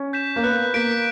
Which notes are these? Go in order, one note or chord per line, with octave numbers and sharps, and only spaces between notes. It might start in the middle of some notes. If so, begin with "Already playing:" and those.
Already playing: C#4
G6 B6 E7
A#3
B3 F#6
A#3 B6 D7